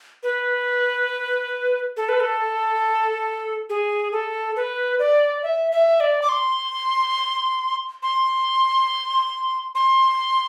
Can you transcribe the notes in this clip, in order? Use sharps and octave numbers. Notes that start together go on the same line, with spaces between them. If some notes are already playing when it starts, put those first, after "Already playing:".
B4
A4
B4
A4
G#4
A4
B4
D5
E5
E5
D5
D6
C6
C6
C6